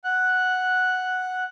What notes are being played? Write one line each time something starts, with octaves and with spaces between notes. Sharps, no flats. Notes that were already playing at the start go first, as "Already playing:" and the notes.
F#5 F#6